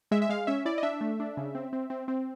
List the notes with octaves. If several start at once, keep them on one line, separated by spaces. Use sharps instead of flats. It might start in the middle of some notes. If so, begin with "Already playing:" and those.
G#3 E5
E5
G#3 F5
C#4 E5
E4 D5
D#5
D4 E5
A3
D4
C#3
C4
C4
C4
C4